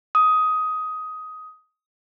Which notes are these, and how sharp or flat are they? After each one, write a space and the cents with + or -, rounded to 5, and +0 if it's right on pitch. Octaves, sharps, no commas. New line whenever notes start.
D#6 +15